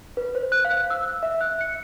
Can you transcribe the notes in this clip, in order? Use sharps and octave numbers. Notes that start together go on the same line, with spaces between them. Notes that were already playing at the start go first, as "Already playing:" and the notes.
B4
C5
F#6
F5
E6
E5
F#6
C#7